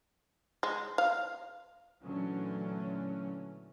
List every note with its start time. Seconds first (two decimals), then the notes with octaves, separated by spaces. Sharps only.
0.63 G#3
0.98 F5
2.04 A#2 D3 E3 F#3 A3 C#4